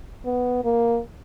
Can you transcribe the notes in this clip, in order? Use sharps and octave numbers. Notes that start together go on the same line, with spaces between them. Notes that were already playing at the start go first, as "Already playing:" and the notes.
B3
A#3